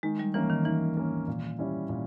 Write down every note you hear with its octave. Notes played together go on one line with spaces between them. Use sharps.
D#3 G#3
G3
E3 A#3 C#4
D#3
D#3 E3
A#3 C#4
A#2
G3 C#4 E4
A#2